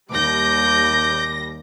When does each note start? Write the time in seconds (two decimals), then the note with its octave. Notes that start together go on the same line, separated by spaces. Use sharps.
0.11 D#2 G3 D6 G6 A#6